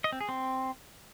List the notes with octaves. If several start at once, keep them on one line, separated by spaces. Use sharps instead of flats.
D#5
C4
G#4
C4